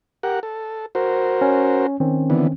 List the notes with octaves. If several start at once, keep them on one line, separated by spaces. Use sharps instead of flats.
G4 A#4 F#5
A4
F#4 A#4 C5
C#4
D#3 C4 C#4
D3 E3 B3